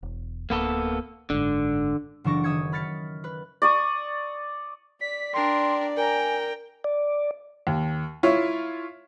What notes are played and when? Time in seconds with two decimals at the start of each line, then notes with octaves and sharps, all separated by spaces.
0.03 E1
0.50 D1 A#3 B3 A4
1.30 F#1 G#2 D3
2.24 F#1 E3 D4 A4 C#6 A#6
2.43 D#3 E5 D#6 E6 G#6 C#7
2.72 B5 F6 A6 B6 C#7
3.24 B4
3.62 D5 C#6 D#6
5.01 D5 B6
5.34 D4 A#4 G5 C6
5.97 A#4 G5 G#5 A#5
6.84 D5
7.67 D#2
8.23 E4 F4 C#5